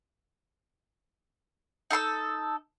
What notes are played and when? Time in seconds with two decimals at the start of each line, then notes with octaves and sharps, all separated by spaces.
1.91 D#4 A4 C6 E6